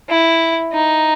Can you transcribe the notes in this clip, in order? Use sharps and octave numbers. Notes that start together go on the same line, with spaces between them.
E4
D#4